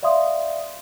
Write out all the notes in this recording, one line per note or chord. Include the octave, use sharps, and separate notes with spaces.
D5 E5 F5 C6 D#6